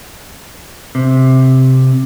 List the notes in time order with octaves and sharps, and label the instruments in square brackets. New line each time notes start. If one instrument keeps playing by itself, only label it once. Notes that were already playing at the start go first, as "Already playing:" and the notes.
[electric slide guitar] C3